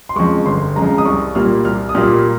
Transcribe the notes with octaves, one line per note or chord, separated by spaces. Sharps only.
C6
F2 C#3 G#3 C#6
G1 C6
F2 C#3 G#3 A#5
D#6
C2 C#6
A#2 G3 A#3 F6
C2 F6
D#6
A#2 G3 A#3 F6